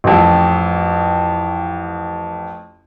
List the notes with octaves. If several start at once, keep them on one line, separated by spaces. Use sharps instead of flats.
A1 F2